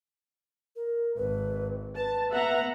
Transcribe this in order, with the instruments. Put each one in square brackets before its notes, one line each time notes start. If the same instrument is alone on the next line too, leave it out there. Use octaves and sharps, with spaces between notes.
[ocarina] A#4
[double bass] G#1 [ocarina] B4
[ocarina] B4 [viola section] A5
[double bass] B3 [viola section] E5 F#5 A#5